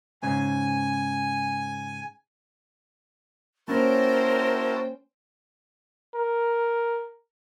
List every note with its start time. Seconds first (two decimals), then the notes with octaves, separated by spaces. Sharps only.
0.23 G#2 C#3 G#5
3.68 A#3 C#4 E4 F#4 A#4 C5 G5 A5
6.15 A#4